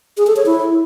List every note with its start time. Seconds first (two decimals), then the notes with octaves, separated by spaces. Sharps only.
0.17 G#4
0.27 A4
0.36 C#5
0.46 E4